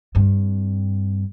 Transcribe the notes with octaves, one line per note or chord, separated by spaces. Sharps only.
G2 C4